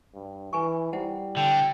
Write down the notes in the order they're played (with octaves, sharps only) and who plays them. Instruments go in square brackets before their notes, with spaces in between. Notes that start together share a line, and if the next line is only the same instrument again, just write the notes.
[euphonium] G2
[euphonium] E3 [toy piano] B4 G#5 C#6
[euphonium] G3 [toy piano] E4 C5 F#5
[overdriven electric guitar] D3 [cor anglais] G5